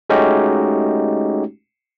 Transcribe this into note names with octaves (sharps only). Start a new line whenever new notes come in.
G#3 A3 C#4 D#4 F#4 G4